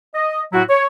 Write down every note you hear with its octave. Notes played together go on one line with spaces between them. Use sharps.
D#5
A2 F#3 E4 F#4
C#5